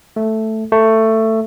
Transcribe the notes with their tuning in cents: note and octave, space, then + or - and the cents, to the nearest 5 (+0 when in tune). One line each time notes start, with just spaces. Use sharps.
A3 +0
A3 +15